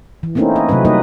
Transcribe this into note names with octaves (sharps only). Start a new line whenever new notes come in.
E3
A3 A#3 C4 C#4 D#4 E4
D#5
C3 F#3 A3 C4 B4
G3 A#3 D#4 B4 D#5